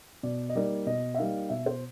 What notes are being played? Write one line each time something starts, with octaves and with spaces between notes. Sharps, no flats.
B2 D5
D#5
G3 A#3 D#4 D5
B2 D#5
E5
G3 A#3 D#4 F5
B2 E5
C5